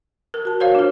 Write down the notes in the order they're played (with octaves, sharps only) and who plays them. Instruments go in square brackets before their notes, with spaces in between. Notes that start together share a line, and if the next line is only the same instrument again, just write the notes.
[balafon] A#4
[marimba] F#4 A5
[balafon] C5 C#5 F5
[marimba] D4 F4